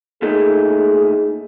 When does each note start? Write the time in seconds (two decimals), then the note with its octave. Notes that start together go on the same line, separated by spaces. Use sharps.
0.22 A#2 A3 D#4 G#4